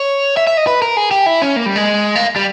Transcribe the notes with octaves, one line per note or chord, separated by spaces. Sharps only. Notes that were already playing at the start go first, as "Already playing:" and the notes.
Already playing: C#5
E5
E5
D#5
B4
A#4
G#4
G4
E4
C#4
A#3
G3
G#3
A#3
G3